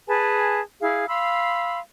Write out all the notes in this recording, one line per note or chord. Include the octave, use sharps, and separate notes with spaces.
G#4 B4 G#5 A5
E4 G#4 F5
F5 B5 C6 E6